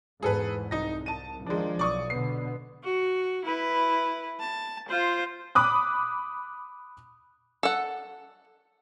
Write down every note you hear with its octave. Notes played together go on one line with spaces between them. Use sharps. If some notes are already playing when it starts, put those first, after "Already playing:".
E2 G#2 G#4 A4 B4
C2 D#4 A#6
A5 D#7
D#3 F3 G#3 D4
B1 D5 C#6 D#6
B2 D3 B3 C7
F#4
E4 B4
A5
F4 C5
B5 D6 D#6 F#6
A4 F#5